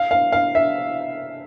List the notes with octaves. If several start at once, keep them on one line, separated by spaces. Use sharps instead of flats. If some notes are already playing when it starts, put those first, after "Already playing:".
Already playing: F5
F5
F5
E5